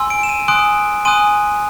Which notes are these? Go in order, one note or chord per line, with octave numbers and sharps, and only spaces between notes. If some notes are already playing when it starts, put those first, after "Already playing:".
Already playing: G#5 C6 E6
D7
E7
D#7
G#5 C6 D#6 F#6 D7
G#5 C6 D#6 F#6 D#7